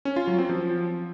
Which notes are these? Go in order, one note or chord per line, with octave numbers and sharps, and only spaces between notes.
C#4
F4
F#3
C4
F3